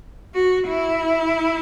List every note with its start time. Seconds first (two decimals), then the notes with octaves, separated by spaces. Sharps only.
0.34 F#4
0.68 E4